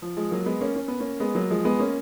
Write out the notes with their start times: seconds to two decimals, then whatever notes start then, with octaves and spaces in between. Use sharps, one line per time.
0.02 F3
0.17 F3 G#3
0.31 F#3 A#3
0.46 G#3 B3
0.61 A#3 C#4
0.76 C#4
0.88 B3
1.00 A#3 C#4
1.20 G#3 B3
1.35 F#3 A#3
1.50 F3 G#3
1.65 G#3 B3
1.79 A#3 C#4